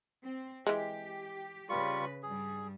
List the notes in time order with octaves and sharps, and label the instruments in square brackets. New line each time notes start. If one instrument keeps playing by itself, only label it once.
[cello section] C4
[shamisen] E3 G#3 [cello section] G4
[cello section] C#3 B4 [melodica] G3 F4 C#6
[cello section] G2 G3 [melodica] G#4